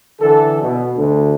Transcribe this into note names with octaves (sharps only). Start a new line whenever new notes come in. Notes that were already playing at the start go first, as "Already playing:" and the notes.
D3 E3 A4
B2
D2 D3